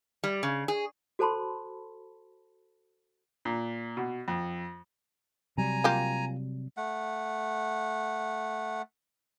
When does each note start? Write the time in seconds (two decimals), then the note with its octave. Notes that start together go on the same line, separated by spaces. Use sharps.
0.24 G3
0.43 C#3
0.68 G#4
1.19 F#4 A4 C5 A5 B5 C6
3.45 A#2
3.97 B2
4.28 F2
5.58 C3 F#3 G3 G#5 A#5
5.84 A#3 F4 G4
6.77 A3 F#5